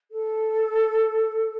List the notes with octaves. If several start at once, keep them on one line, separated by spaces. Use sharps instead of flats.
A4